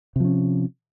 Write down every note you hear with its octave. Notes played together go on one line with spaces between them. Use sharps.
C3 F3 C#4